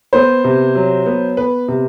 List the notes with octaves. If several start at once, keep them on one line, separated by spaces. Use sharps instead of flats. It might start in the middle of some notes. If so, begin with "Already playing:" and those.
B3 C5
C3
F#3
B3
B3 B4
C3